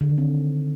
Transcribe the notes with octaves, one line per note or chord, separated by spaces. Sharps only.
D3
D#3
C4